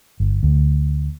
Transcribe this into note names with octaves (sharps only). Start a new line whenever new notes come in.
G1
D2